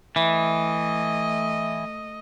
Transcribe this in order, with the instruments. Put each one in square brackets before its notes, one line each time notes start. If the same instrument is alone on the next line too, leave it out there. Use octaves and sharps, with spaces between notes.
[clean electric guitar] E3 [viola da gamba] A3 D#5